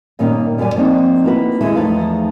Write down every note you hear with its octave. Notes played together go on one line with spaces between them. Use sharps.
G2 A#2 D#3 A#3 C#4 D#4
F#2 G3 A#4 D5 G#5
F3 A#3 C4 D#4
A#3 E4 F#4 B4
D#2 G#3 E4
E2 F3 A3 D#4 B4 F5